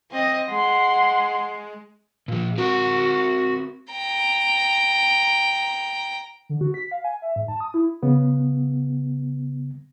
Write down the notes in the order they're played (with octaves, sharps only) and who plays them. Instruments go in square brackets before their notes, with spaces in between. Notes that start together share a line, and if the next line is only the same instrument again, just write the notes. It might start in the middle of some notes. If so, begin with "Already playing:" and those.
[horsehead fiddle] C4 D#5
[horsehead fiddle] G#3 [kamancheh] F#5 C6
[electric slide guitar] A#2 F3
[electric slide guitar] C4 A#4 [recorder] F#4
[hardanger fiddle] G5 A#5
[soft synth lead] D3
F#4
B6
F5
G#5
E5
G#2
A5
D#6
E4
[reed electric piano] C#3 B3